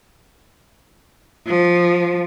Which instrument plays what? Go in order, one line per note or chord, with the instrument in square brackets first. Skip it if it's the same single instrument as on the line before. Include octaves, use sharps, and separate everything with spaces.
[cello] F3